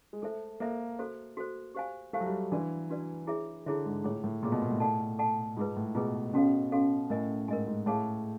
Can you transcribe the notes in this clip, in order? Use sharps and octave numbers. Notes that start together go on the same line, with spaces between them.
G#3
A3 A4 C5 E5
A#3 A4 C5 E5
F#4 A4 C5
F#4 A4 C5
G4 C5 F5 G#5
A3 G4 C5 F5 G#5
F#3
G3
E3 D4 F#4 B4 D5
D4 F#4 B4 D5
E4 G#4 C#5 E5
D3 E4 G#4 C#5 E5
G#2
A2 F4 G#4 C#5
A2
A#2 F4 G#4 C#5
B2
A#2
A2
A4 D5 F#5 A5
A4 D5 F#5 A5
G#2 F4 G#4 B4
A2
B2 F4 G#4 B4
B2 C#4 F#4 A4 C#5 F5
C#4 F#4 A4 C#5 F5
A2 A#4 D#5 G#5
G#2 A#4 D#5 G#5
G#2
A2 G#4 C#5 F5 A5